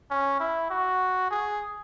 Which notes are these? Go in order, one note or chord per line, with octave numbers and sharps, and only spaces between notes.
C#4
E4
F#4
G#4